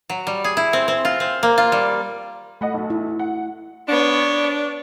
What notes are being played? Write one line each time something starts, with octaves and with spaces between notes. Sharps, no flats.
F#3
G3
G#4
E4
C4
C4
F4
C4
A#3
F4
G3
A3 D#5 F#5 B5
B1
E4
F#5
B3 D4 C#5